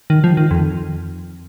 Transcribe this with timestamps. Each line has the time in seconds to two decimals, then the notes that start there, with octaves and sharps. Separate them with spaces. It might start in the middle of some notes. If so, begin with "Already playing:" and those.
0.10 D#3
0.24 F3
0.37 D#3
0.51 F2